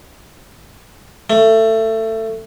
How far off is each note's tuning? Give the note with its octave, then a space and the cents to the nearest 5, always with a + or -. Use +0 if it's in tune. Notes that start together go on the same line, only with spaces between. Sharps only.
A3 +20